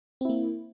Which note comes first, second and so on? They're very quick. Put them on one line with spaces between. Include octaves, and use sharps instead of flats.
C4 E4 A#3